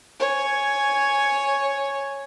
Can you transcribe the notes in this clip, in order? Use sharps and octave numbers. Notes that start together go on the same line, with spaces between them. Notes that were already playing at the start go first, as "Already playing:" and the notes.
C#5 G#5